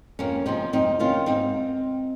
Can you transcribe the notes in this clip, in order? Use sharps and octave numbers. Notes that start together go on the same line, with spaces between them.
F2 A#3 C#4
C3 F3 C4 D#4
F2 C4 D#4
D#3 C#4 F4
G#2 C4 D#4